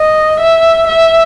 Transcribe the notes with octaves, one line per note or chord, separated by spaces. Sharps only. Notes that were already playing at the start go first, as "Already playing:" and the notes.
Already playing: D#5
E5
E5